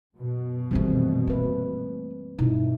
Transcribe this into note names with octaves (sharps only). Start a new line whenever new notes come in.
F#2 B2
D#3 E3 G3 A3 C4
A3 A#3 B4
G2 B2 D#4 E4